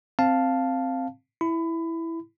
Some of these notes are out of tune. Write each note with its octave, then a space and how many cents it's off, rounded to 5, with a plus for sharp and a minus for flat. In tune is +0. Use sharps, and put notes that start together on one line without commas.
C4 +5 F5 +0 A5 +0
E4 +0 B5 +25